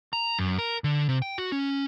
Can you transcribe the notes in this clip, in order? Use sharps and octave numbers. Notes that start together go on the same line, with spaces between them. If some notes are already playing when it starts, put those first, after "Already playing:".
A#5
F#2
A#4
D3
C3
G5
F#4
C#4